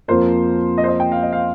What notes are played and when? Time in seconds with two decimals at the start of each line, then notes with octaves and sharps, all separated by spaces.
0.08 F2 F3 A#3 F4 A#4 C5
0.78 D#5
0.84 C5
0.88 D#5
1.00 G5
1.12 F5
1.22 D#5
1.33 F5